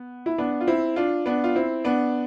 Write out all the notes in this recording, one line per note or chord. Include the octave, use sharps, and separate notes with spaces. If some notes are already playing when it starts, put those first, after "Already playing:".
Already playing: B3
E4
B3 D4
F4
C4 E4
D4 F4
B3 D4
F4
C4 E4
B3 D4